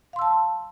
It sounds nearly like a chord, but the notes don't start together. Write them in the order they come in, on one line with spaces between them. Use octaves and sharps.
F5 C6 E6 A5